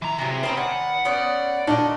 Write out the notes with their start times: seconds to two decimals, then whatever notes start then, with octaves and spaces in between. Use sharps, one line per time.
0.02 E3 E4 A#5
0.18 C3 F#3 G#4
0.43 C#4 B4 C5 D#5 G5 A#5
0.57 D#3 D5 F#5 G#5
1.05 B3 C#4 C5 D5
1.67 A#2 D3 D4 F#4 D#5